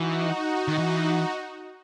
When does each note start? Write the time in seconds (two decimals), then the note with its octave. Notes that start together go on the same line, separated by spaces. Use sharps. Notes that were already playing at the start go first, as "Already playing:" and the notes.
Already playing: E3 D#4 F#4
0.68 D#3
0.78 E3